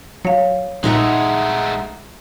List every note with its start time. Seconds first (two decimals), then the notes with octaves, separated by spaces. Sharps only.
0.25 F#3 C#5 F5
0.84 A#1 G#3 A3 D#4 E5 F#5